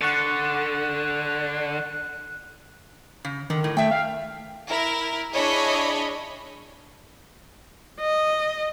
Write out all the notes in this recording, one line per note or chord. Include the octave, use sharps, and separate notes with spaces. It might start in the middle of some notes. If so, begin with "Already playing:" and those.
D3 F#5 C#6 F#6 A6
C#3
D3 D#3
A2
A3 E5 G5
F5
E4 A#4
D4 E4 G#4 C#5 D#5 B5
D#5